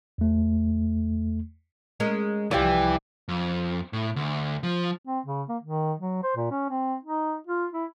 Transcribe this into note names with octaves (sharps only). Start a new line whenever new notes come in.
E2 A3
G#3 C#4 A#4
C2 E3 F3 F4 G4 B4 D5
F2
A2
D2
F3
C4
C#3
A#3
D#3
F#3
C5
A#2
C#4
C4
D#4
F4
E4